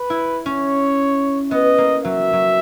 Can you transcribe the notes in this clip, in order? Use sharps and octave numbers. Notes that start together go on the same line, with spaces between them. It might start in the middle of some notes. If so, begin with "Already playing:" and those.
Already playing: B4
E4
C#4 C#5
B3 D#5
A#3
F#3 E5
F#3